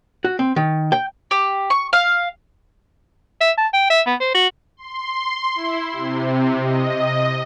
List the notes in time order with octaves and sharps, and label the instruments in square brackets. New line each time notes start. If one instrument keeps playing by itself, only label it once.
[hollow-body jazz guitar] F#4
C4
D#3
G5
[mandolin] G4
C#6
F5
[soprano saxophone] E5
A5
G5
E5
B3
C5
F#4
[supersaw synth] C6
E4
C3
D#5